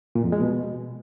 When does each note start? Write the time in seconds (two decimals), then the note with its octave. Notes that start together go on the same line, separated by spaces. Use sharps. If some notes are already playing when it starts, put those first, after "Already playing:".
0.15 A#2
0.24 F2
0.32 G#3
0.41 B2